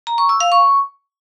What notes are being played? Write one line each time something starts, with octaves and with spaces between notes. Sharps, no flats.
A#5
C#6
E6
F5
C#6